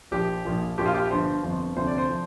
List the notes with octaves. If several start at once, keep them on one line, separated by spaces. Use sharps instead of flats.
A#1 A#2 F3 G4
A#1 A#2 F3
A#1 A#2 F3 G4
F4
G4
G1 G2 F3 C5
G1 F2 F3
D2 C3 F3 C5
D5
C5
F3